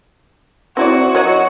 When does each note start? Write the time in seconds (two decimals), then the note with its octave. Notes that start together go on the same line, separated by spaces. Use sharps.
0.77 C4 E4 F#4 D5
1.15 F#3 F#4 C#5 D#5